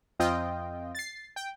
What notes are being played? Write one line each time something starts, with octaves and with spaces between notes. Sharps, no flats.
F2 C4 F4 D#5 G5
A6 C7
G5